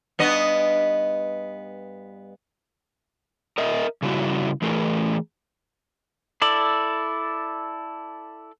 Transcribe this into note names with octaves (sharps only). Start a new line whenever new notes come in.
G2 B3 D#5
A#4 D#5 E5
C#3 G3 E4 F#4
E3 A3 G#4 A#4
E4 A4 D5